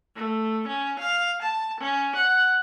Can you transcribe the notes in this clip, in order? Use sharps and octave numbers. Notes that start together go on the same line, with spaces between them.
A3
C#4
F5
A5
C#4
F#5